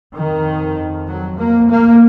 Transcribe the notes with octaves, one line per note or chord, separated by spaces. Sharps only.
F2 D#3
F#3
A#3
A#3